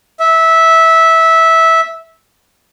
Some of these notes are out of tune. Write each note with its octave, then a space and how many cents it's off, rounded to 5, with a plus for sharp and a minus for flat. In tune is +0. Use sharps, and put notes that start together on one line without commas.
E5 -15